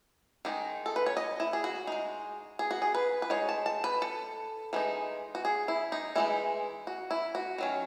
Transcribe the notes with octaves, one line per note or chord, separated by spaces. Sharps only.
D#3 G#3 D#4
A4
B4
C#5
D#5
E4
G#4
F#4
G#3 D#4
G#4
F#4
G#4
B4
B4
G#3 D#4 C#5
A5
A5
B4
A4
E3 G#3 D#4
F#4
G#4
E4
D#4
E3 G#3 D#4 E4
F#4
E4
F#4
D#3 F#3 C#4